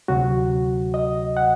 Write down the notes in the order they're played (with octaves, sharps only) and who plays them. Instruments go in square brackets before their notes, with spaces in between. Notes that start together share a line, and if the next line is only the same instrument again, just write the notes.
[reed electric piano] D2 C3 F#3 F#4
D#5
F#5